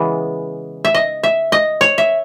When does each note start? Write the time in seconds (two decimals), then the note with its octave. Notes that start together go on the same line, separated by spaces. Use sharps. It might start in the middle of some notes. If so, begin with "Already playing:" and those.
Already playing: C#3 E3 G#3 B3
0.85 E5
0.95 D#5
1.23 E5
1.52 D#5
1.81 C#5
1.98 E5